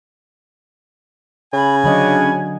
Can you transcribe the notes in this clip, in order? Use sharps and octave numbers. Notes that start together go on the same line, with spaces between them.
C#3 G#5 B5
D3 F#3 C#4 D4 D#5 B5